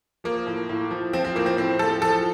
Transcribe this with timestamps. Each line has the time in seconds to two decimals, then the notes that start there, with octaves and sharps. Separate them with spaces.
0.24 F3 A#3
0.47 A2
0.69 A2
0.91 F3
1.13 F3 C4
1.25 C4
1.35 A2 A#3
1.46 C4
1.57 A2 C4
1.79 F3 A4
2.02 F3 A4